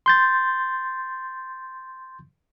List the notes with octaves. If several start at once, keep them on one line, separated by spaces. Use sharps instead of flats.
C6 G6 A6